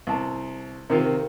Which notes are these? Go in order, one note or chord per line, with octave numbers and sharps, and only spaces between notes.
C2 A5
C3 D#3 F4 A#4